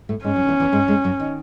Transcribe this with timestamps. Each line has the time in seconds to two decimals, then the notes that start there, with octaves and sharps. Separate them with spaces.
0.09 A2 A3
0.24 G#2 G#3 C#4
0.36 F#2 F#3
0.43 D#3
0.49 E2 E3
0.60 E2 E3
0.72 G#2 G#3
0.88 G#2 G#3
1.04 F#2 F#3
1.20 D#3